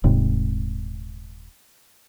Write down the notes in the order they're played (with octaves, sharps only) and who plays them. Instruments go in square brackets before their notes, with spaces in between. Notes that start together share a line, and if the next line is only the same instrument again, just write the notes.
[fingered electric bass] D#1 G#2 C3